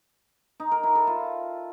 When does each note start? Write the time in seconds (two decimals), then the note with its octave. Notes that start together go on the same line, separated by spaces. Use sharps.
0.60 D#4
0.72 A#4
0.83 E4
0.95 A4
1.07 F4